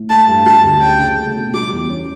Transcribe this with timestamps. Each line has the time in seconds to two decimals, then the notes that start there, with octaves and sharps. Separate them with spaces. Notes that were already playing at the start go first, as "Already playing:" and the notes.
Already playing: A2
0.09 A3 A5
0.28 G2
0.46 G3 A5
0.64 D2
0.81 C#4 G5
0.99 C#3
1.18 A3
1.36 B2
1.54 G3 D6
1.72 E2
1.90 C#4